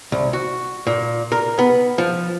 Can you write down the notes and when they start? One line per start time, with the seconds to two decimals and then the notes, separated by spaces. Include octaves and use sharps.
0.12 C2
0.33 F#4
0.87 A#2
1.32 A#4
1.59 B3
1.98 F3